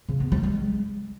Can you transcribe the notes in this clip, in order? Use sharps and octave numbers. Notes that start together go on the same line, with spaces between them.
C#3
B3
G3
G#3